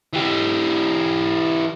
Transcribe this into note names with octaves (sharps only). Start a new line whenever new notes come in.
E3 G4